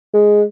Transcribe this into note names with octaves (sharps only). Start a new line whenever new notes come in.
G#3